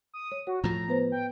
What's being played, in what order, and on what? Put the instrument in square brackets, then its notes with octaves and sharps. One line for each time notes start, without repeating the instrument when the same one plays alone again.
[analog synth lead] D#6
[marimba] C#5
[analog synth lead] F#4 [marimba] C#5
[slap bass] A2 F3 [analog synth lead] A#5
[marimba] B3 B4 C5
[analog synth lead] G5